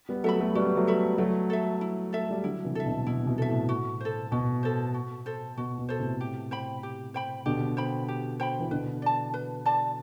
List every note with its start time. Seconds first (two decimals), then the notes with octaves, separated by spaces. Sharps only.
0.09 G3 B3
0.24 F#3 A3 A4 E5 B5
0.40 F#3 A3
0.55 G3 B3 F#4
0.66 B3
0.77 F#3 A3
0.87 A4 E5 B5
1.18 F#3 A3 E4
1.50 A4 E5
1.81 E4
2.13 A3 A4 E5
2.30 G3
2.44 D3 F#3 E4
2.65 C3 E3
2.75 A4 E5
2.86 B2 D3
3.06 B2 E4
3.24 C3
3.27 B2
3.38 A4 E5
3.49 A2
3.69 F#4
4.01 A4 C5
4.32 B2 F#4
4.63 A4 C5
4.94 F#4
5.26 A4 C5
5.57 B2 F#4
5.78 B2
5.89 A4 C5
5.99 A2 C3
6.20 G4
6.51 C5 G5 B5
6.83 G4
7.14 C5 G5 B5
7.46 B2 D3 G4
7.77 C5 G5 B5
8.08 G4
8.40 C5 G5 B5
8.60 E3
8.71 B2 D3 B4
9.02 D5 A5
9.34 B4
9.66 D5 A5